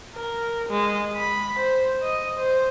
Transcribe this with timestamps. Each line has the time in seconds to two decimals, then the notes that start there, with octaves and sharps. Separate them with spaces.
0.16 A#4
0.69 G#3
1.16 B5
1.59 C5
2.03 D#5
2.38 C5